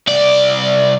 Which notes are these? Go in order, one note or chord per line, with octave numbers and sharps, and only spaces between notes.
C2 D5